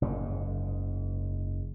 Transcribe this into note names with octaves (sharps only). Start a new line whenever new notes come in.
F#1 G#2